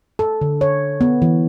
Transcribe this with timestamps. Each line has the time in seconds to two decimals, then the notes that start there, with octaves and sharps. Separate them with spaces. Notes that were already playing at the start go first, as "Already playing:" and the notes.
0.19 A4
0.41 D3
0.61 C#5
1.01 B3
1.22 E3